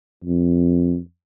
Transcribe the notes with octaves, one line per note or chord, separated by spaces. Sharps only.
F2